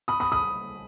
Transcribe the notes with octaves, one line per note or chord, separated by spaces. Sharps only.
B5 D#6
B5 D#6
B5 D#6